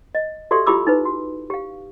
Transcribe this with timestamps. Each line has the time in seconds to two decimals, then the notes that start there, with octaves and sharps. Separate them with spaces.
0.15 D#5
0.51 F#4 G4 A4 D5 E5 C6
0.66 E4 F4 G4 B5 D6 E6
0.87 D#4 E4 B4
1.05 F#4
1.50 G4 F5